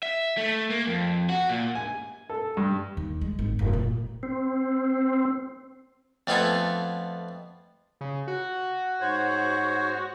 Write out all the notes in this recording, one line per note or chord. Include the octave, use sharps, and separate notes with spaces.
E5
A3
A#3
F2
F#4
A#2
G#5
A4
G2
D#2
G#3
G#1
F1
A#2
C4
F2 A3 B3 F4 A4 G#5
C#3
F#4
G#2 C5 C#5